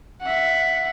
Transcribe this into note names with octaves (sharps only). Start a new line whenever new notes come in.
E5 F#5